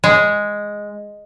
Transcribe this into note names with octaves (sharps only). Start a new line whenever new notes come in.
G#3